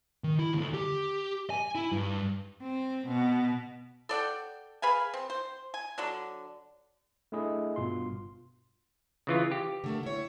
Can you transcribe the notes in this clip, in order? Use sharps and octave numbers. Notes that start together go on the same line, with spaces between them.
D#3
E4
D2
G4
G#5
E4
G2
C4
B2
A4 D5 F#5 G5
G#4 B4 F5 G#5
C4
C5
G#5
D3 F#3 D4
A3 D4 E4 G#4 D#5
G1 G2 B2 F4 C6
C#3 E3 F4
G4
D3 A3 A#3
E4 C#5